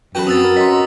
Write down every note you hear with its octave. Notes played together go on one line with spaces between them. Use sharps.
F#2 B3 F#4 A4 G5 B5
C4 D#6 E6 A6
A#4
C#4 D#5 A#5 C6 B6